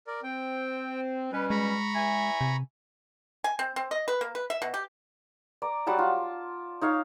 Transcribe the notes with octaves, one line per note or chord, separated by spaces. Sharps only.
A#4 D5
C4 G5
B2 G3 C#4 B4
G#3 A#5 B5 C#6
E2 E5 G#5
C3
G#5
C4
C4
D#5
B4
A#3
B4
E5
B2
G4
D5 A#5
F#3 G3 F#5 A5
F4
D#4 C#5 F5